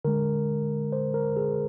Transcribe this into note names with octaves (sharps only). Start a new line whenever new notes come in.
D3 G#3 A#4
C5
A#4
G#4